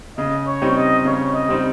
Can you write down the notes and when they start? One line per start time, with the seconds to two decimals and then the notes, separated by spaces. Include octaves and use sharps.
0.17 C#3 D#5
0.46 C#5
0.62 G3 C4 D#4
0.77 D#5
1.05 C#3 C#5
1.34 D#5
1.49 G3 C4 D#4